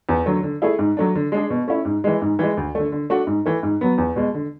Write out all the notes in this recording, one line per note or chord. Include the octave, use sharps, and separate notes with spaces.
E2
D3 F#3 A3
D3
A3 E4 G#4
G#2
F#3 A3 D4
D3
G#3 D4 G#4
B2
A3 C#4 E4
G#2
E3 G#3
G#2
E3 G#3
D2
D3 A3
D3
A3 D4 F#4
G#2
E3 A3
G#2
F#3 B3
E2
B2 G#3
D3